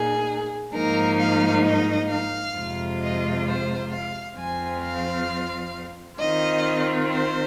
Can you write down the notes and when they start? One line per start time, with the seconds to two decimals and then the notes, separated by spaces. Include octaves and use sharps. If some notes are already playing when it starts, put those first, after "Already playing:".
Already playing: A#2 A#3 D#4 G#4
0.73 G#2 F3 A#3 D#4 A#4
1.18 F5
1.64 D#5
2.09 F5
2.54 F2 C3 G#3 F4
3.01 D#5
3.46 C5
3.91 F5
4.37 F2 F3 C4 F4 G#5
4.82 F5
6.19 D#3 C4 F4 D#5
7.10 C5